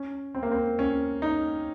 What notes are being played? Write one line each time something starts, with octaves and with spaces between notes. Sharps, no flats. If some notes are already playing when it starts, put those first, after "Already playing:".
Already playing: C#4
C4
A#3
C4
C#4
D#4